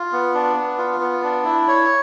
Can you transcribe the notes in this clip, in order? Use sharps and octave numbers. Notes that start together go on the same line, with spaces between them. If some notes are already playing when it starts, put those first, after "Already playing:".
Already playing: F4
B3
D4
B3
F4
B3
D4
E4
C#5